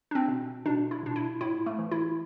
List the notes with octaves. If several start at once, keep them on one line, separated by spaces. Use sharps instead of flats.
D4
C4
B2
B2 D4
E4
B2 D4
E4
A2 E4
A3
E3
E4